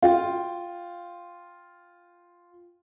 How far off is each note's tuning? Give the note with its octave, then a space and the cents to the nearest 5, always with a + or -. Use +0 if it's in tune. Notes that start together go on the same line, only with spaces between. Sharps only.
F4 +0 G5 +0